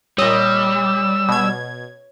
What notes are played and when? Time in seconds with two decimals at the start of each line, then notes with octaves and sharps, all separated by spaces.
0.18 A#2 G3 C#5 D#5 E6
1.29 B2 G#6